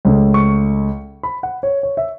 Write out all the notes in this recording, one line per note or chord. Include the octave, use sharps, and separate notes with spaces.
C#2 C#3 A3
C#6
B5
F#5
C#5
C#5
E5